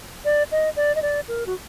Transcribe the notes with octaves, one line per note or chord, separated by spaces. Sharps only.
D5
D#5
D5
D#5
D5
A#4
F#4